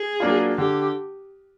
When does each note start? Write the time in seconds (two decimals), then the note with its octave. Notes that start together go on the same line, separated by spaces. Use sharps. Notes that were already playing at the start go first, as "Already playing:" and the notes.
Already playing: G#4
0.20 F#3 A#3 D4 F4
0.58 D3 G4